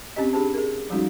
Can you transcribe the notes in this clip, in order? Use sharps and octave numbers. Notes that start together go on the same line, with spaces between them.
C4 C#4 G4 D#5
D4 G4 G#4 C5 A5
G#4 A#4
F3 G3 G#3 C#4 D#4 F#4